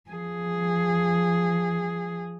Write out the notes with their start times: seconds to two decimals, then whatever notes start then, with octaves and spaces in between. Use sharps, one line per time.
0.10 F3 G#4